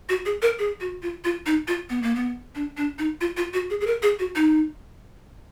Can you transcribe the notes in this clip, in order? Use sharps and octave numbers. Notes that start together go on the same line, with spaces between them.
F#4
G#4
A#4
G#4
F#4
F4
F4
D#4
F4
B3
A#3
B3
D4
D4
D#4
F4
F4
F#4
G#4
G#4
A#4
G#4
F#4
D#4